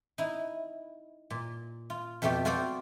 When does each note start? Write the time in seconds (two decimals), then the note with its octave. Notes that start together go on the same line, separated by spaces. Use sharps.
0.18 D#4 E4
1.30 A#2
1.90 F4
2.22 F2 B2 A3 G4 G5
2.45 F4 F#4 A4 C5 D5 G5